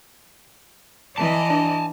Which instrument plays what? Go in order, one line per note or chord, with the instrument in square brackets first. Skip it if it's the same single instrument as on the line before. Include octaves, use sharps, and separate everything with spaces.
[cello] E3 [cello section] D5 D#5 [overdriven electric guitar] G#5 A5
[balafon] D4